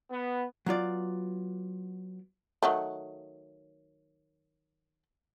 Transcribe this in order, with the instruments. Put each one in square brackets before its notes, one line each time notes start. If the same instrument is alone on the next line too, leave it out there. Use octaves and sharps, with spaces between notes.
[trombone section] B3
[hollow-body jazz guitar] F#3 B3 F4 D5
[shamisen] D#3 F#3 A3